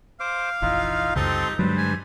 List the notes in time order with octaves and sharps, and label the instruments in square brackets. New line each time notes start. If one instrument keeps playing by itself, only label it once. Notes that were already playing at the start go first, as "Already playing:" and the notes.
[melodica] C5 D6 [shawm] F5
[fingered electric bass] F1 A#1 [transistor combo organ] E3 [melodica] D#4 F4
[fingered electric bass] C#2 F#2 C#3 [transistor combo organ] G3 [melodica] C4 A4 C6 [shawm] D#4
[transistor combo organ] G2 D3 [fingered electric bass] F#3 G#3 [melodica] B4 C5
[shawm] G#5